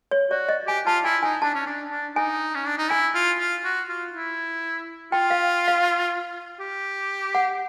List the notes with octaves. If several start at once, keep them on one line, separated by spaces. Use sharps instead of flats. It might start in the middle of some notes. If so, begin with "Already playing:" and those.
C#5
F#4 D5
D#5
G4 G#5
F4 A5
E4 G#5
D#4 G#5
D4 A5
C#4
D4
D4
D#4 G#5
C#4
D4
D#4
E4 G#5
F4
F4
F#4
F4
E4
F4 G5
F5
F5
G4
F#5